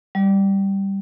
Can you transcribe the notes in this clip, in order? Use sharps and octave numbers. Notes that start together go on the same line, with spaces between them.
G3